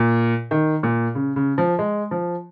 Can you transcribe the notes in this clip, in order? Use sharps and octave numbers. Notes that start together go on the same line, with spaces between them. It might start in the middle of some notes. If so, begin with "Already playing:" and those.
Already playing: A#2
D#3
A#2
C#3
C#3
F3
G#3
F3